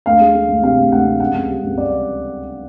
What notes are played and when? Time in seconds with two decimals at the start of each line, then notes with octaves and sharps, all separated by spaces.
0.06 D2 F5
0.20 G#3
0.35 G#3
0.49 D2
0.63 C3 F5
0.78 D2
0.92 D2 F#5
1.06 C3
1.20 C#2 F#5
1.34 C#2
1.49 G3
1.63 C#2
1.77 C#2 D5